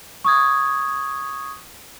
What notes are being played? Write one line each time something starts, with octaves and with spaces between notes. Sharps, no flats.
C#6 D#6 G#6